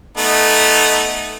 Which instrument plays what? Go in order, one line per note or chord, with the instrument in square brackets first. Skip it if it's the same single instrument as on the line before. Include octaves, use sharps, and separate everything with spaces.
[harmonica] A3 B3 D#4